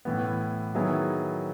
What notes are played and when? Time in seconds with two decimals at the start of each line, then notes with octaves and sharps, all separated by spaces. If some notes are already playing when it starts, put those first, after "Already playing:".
0.05 A2 E3 B3
0.75 D#3 F#3 B3 E4 G#4